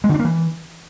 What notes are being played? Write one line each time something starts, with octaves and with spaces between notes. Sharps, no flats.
G#3
D3
D4
A#3
E3